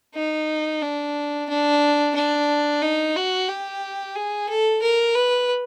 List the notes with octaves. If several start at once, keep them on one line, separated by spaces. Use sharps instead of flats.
D#4
D4
D4
D4
D#4
F#4
G4
G#4
A4
A#4
B4